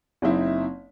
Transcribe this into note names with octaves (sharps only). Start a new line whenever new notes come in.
F#1 C4 D#4 E4 E5